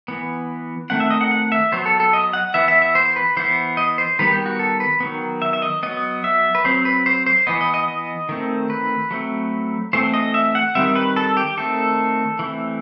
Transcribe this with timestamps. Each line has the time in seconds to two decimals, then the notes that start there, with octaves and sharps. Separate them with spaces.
0.08 E3 B3
0.90 D#3 A3 C4 F#5
1.00 E5
1.10 D#5
1.21 F#5
1.31 F#5
1.52 E5
1.72 F#3 B3 C5
1.86 A4
2.00 A4
2.13 D#5
2.33 F#5
2.54 E3 B3 E5
2.68 E5
2.82 E5
2.95 C5
3.16 B4
3.37 E3 B3 C5
3.77 D#5
3.98 C5
4.19 D#3 G3 B3 B4
4.32 G4
4.46 F#4
4.59 A4
4.80 B4
5.00 D#3 F#3 B3
5.42 E5
5.53 E5
5.62 D#5
5.83 F#3 B3 D#5
6.24 E5
6.55 B4
6.65 F#3 C4 C5
6.85 B4
7.06 C5
7.26 C5
7.47 E3 B3 D#5
7.61 D#5
7.74 D#5
7.88 D#5
8.29 D#3 A3 C4
8.70 B4
9.11 F#3 A3 C4
9.93 E3 A3 C4 C5
10.14 D#5
10.34 E5
10.55 F#5
10.75 D#3 G3 C4 E5
10.96 B4
11.16 A4
11.37 G4
11.57 D#3 A3 C4 A4
12.39 E3 A3 C4